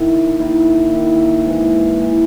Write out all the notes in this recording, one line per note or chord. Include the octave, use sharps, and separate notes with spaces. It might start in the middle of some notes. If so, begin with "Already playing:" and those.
Already playing: D#3 A#3 E4
D#3 A#3 E4
D#3 A#3 E4
G#2 E3 A#3
E3 A#3